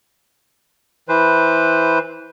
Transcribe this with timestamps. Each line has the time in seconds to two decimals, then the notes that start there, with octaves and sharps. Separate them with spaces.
1.09 E3 B4 C5